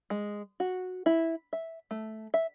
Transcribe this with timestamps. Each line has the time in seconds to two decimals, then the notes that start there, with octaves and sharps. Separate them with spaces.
0.10 G#3
0.60 F#4
1.06 E4
1.53 E5
1.91 A3
2.34 E5